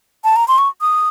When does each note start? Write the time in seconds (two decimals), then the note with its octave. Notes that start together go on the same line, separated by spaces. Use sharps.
0.24 A5
0.36 A#5
0.48 C6
0.58 C#6
0.81 D#6